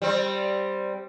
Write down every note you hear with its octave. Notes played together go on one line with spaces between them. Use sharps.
G3 C4